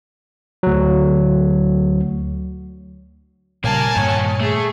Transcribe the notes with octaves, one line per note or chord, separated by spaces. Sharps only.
D2 F#3
A#2 C#3 G3 A#3 G#5 A5
G2 A#2 D#3 C#5
A3 G#4